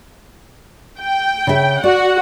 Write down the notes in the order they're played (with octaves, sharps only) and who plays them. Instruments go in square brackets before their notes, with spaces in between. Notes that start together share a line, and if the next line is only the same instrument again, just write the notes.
[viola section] G5
[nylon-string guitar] C#3 E5
[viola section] F#4 F#5 [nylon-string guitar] D5